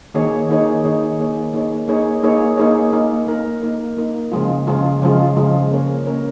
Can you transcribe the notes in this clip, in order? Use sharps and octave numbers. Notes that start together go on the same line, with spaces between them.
D#3 A#3 D#4 G#4 C#5
D#3 A#3 D#4 G#4 C#5
D#3 A#3 D#4 G#4 C#5
D#3 A#3 D#4 G#4 C#5
A#3 D#4 G#4 C#5
A#3 D#4 G#4 C#5
A#3 D#4 G#4 C#5
A#3 D#4 G#4 C#5
A#3 D#4 A#4
A#3 D#4 A#4
A#3 D#4 A#4
A#3 D#4 A#4
C#3 F3 G#3 F4
C#3 F3 G#3 F4
C#3 F3 G#3 F4
C#3 F3 G#3 F4
A#3 C#4 A#4 C#5
A#3 C#4 A#4 C#5